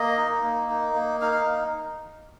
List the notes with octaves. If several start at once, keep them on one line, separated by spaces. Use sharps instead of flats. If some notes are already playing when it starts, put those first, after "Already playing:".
Already playing: A#3 D#5
D#4
A#3
D#4
A#3
D#4 F5
F5